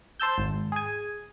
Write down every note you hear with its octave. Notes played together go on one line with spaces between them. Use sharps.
C5 A5 E6 G6
G#1
G#4 G#5